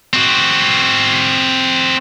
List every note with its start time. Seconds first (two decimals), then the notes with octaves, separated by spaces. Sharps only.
0.13 C4 F#4